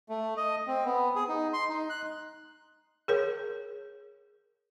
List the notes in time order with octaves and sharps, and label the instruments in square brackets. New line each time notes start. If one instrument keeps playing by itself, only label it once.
[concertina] A3
D#5
C4
B3
G#4
D#4
C6
D#4
F#6
[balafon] G#4 A#4 C#5